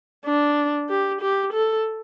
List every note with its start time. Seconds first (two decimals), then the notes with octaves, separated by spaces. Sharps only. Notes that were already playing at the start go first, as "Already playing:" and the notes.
0.25 D4
0.89 G4
1.21 G4
1.53 A4